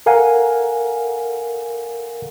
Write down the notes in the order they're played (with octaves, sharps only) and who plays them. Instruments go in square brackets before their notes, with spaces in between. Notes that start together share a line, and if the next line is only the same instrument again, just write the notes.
[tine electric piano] A4 A#4 F5 F#5 G#5 A#5